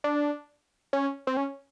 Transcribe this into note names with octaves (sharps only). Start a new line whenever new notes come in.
D4
C#4
C4
C#4